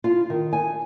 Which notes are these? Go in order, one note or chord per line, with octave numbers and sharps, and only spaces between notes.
F4
D#3
G#5